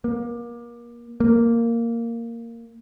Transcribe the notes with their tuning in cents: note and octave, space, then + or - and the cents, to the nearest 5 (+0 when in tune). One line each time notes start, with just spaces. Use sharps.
A#3 +30
A#3 -10